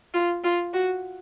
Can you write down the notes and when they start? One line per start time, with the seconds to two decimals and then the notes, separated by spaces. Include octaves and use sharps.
0.14 F4
0.44 F4
0.73 F#4